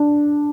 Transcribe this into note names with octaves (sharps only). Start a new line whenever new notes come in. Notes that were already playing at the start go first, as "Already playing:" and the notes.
Already playing: D4